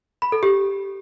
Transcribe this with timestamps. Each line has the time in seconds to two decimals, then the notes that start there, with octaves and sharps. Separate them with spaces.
0.22 B5
0.32 A4
0.43 G4